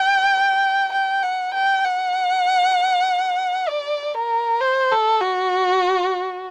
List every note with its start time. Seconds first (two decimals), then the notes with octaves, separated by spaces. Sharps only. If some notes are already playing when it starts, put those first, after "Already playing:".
Already playing: G5
0.92 G5
1.23 F#5
1.54 G5
1.84 F#5
3.68 D5
4.14 A#4
4.60 C5
4.91 A4
5.21 F#4